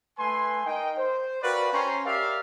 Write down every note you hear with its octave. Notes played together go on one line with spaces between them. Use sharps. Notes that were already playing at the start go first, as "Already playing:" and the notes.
A3 B4 G#5 C6
D#4 A#4 D#5 G5
C5
F#4 A#4 B4 D5 F5 G5
C#4 C5 C#5 G5 A#5 C6
G4 A#4 D5 E5 F5